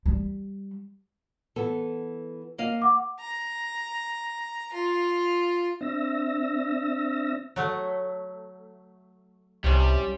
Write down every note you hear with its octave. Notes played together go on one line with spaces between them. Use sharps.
G3
E3 B3 A4
A#3 D#5 F5
F#5 D6
A#5
F4
C4 D4 E5 E6 A#6
F#3 A3
C2 G3 C#4 F4